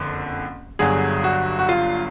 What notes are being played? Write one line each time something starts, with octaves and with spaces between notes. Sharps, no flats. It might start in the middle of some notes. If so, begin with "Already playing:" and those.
Already playing: F#1 F2 D3
G1 G2 D3 F#3 G#4
F#4
F#4
F4